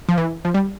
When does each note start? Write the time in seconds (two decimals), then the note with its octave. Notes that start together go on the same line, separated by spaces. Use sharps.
0.09 F3
0.17 E3
0.45 F3
0.54 G3